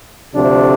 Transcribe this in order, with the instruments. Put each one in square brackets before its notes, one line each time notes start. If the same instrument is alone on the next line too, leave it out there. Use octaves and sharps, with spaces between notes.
[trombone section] D2 C3 F3 A3 D4